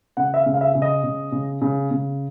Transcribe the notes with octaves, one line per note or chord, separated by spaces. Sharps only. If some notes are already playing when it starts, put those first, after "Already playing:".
C#3 F#5
E5
F5
C#3
F5
E5
C#3
D#5
C#3
C#3
C#3
C#3